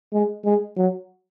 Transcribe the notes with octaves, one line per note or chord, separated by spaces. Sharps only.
G#3
G#3
F#3